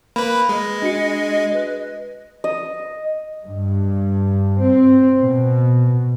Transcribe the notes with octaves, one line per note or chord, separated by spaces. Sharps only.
A#3 B4 B5
G#3 D#5
D4 F#4 C#7
B4
D#5
G2
C4
B2